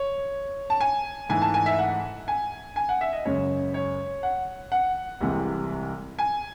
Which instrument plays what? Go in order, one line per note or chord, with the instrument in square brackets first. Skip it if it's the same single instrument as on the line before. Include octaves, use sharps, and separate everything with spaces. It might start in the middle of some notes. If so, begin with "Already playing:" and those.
Already playing: [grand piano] C#5
A5
G#5
G#2 E3 A3 G#5
A5
G#5
E5
F#5
G#5
G#5
F#5
E5
D#5
F#2 C#3 G#3 C#5
C#5
F#5
F#5
C2 C3 E3 G#3
G#5